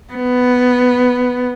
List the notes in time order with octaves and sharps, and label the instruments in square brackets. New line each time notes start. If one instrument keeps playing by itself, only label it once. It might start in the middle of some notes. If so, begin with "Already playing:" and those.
[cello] B3